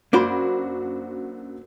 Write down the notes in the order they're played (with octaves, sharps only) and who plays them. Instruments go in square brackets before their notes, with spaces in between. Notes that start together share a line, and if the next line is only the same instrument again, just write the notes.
[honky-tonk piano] F#2 F#4 B5 [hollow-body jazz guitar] A#3 D4 C5